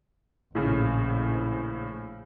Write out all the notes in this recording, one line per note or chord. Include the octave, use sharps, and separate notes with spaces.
A#1 A2 C#3